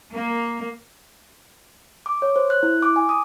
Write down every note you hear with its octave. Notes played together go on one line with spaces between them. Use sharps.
A#3
D6
C#5
C5
F#6
E4
D6
G#5
D#6